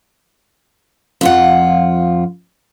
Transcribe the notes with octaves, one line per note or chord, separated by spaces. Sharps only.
F2 F4 F#5